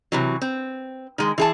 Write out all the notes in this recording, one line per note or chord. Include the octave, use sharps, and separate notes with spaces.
C3 E3 F#3
C4
D#3 G#3
E3 G#4 A5